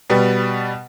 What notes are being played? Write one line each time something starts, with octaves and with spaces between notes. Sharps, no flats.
B2 G3 B3